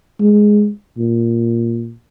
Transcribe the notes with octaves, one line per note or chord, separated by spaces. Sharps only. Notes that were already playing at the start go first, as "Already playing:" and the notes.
G#3
A#2